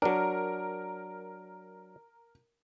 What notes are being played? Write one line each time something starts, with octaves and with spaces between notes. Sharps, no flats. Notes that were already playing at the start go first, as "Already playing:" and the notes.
F#3 D4 A#4